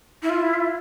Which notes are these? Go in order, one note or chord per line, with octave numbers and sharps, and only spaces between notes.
E4
F4
E4
F4